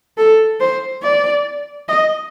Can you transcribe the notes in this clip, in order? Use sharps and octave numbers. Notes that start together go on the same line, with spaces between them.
A4
C5
D5
D#5